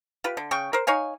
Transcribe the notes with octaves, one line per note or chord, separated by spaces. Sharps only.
F4 G4 B4
D3
C#3 G5 C#6
A#4 C5
D#4 C#5 F5 G#5